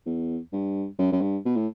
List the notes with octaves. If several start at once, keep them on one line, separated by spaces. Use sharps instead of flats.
E2
G2
F#2
F#2
G2
B2
A2